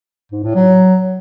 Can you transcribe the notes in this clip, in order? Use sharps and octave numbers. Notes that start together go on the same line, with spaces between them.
G#2
A2
F#3